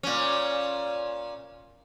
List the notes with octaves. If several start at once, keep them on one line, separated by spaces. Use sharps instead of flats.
A#2 C#4